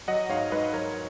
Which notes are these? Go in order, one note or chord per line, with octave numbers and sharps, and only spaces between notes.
F#3 D#5 F#5
G#2 C#5 F5
G#2 B4 D#5
F#3 A#4 C#5